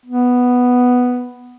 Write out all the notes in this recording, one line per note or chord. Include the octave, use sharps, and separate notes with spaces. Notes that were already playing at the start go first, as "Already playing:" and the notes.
B3